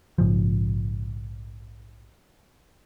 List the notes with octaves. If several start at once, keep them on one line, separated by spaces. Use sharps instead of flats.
A#1 G#2 C#3 F3